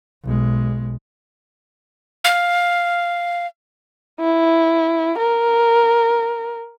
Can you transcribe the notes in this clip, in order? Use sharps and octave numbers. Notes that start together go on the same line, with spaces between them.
B1 G#3
F5
E4
A#4